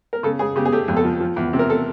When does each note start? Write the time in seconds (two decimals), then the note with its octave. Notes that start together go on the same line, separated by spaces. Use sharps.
0.13 A#4
0.23 C#3 A4
0.39 C#3 G#4
0.56 C#3 G4
0.65 G#4
0.73 A3 G4
0.88 F2
0.97 A4
1.05 F3
1.20 F3
1.36 E2
1.53 C3
1.59 A#4
1.70 A4